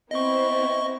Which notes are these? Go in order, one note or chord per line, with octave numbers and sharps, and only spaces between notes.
B3 C4 E4 D#5 C#6